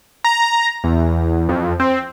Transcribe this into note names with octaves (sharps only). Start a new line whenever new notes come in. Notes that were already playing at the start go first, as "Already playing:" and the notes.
A#5
E2
F2
C4